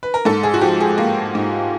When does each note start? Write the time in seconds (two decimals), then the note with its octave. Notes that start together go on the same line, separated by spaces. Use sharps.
0.03 B4
0.14 A#4
0.25 G#2 A4
0.43 G#4
0.54 F#4
0.61 F3 G4
0.80 G#4
0.98 A#3
1.35 G#2